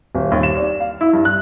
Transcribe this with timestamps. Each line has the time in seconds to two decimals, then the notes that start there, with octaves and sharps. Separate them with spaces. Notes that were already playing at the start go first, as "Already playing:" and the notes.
0.15 D#1
0.32 D#2
0.43 E7
0.57 D5
0.80 F5
1.01 E4
1.13 G2
1.25 F#6